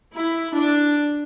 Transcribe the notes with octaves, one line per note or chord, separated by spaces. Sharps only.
E4
D4